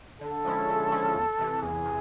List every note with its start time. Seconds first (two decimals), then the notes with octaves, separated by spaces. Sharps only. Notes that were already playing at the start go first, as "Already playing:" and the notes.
0.21 D3 A4
0.45 F3 G#3 C#4 E4
0.68 D3
0.91 F3 G#3 C#4 E4
1.15 E2
1.39 C3 E3
1.62 E2 G#4
1.86 C3